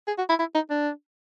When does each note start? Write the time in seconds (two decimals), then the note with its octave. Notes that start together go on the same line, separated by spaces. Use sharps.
0.08 G#4
0.18 F#4
0.29 E4
0.39 E4
0.55 D#4
0.70 D4